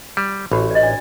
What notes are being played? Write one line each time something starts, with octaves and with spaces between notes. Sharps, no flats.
G3
A1 F#4 G4 B5
D5 D#5
D4 D5